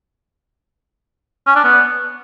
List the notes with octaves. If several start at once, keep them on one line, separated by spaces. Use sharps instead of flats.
C#4
D4
B3